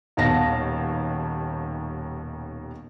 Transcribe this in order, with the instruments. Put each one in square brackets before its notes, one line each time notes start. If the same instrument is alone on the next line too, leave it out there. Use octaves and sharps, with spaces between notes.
[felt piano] D#1 D#2 B2 F5 A5 A#6